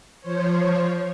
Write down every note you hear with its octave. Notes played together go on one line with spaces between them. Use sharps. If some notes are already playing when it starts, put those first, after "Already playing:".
F3 C5 C#5